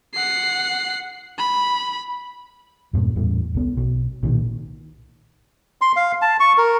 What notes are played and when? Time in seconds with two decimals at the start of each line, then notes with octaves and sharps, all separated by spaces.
0.15 F#5 C7
1.38 B5
2.93 E2 G2 A#2
3.16 E2 A2 G3
3.55 C2 B3
3.77 B1
4.23 B1 A#2 D#3
5.81 C6
5.96 F5
6.22 A5
6.40 C#6
6.58 A#4